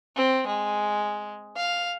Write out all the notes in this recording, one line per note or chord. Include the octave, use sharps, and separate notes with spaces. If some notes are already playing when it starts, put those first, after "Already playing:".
C4
G#3
F5